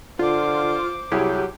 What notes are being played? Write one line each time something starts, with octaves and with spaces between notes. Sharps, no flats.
D3 F4 C5 D6
C2 F#3 E4 G4 G#4